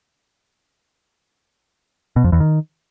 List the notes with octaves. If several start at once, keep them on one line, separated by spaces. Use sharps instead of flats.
B2
F2
E2
D#3